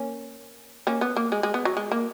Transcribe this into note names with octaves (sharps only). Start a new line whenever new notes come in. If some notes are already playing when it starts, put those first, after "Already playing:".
Already playing: A#3 C#4
A#3 C#4
B3
A#3
G#3
G#3
B3
F#3
G#3
A#3